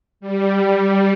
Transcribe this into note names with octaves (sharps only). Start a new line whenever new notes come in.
G3